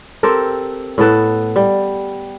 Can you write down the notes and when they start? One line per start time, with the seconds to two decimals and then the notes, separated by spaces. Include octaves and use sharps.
0.23 C4 G4 A4 A#4
0.98 A2 B3 A4 B4
1.56 G3